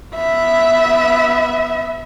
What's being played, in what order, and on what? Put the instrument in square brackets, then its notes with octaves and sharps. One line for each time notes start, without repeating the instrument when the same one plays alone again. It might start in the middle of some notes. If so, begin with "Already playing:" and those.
[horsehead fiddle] B3 E5